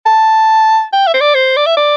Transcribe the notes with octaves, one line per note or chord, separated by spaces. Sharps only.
A5
G5
E5
C5
D5
C5
D5
E5
D5